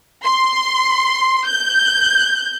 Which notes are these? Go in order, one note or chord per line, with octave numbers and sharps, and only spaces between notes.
C6
G6